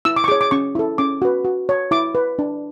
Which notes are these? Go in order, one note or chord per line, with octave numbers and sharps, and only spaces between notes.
E4 E6
D6
C#6
G#4 C#5 D6
D6
C#4 C#6
E4 A4
C#4 D6
F#4 B4
F#4
C#5
E4 D6
B4
D4